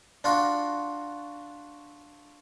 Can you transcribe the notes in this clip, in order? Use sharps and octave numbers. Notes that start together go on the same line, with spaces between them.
D4 F4 F#4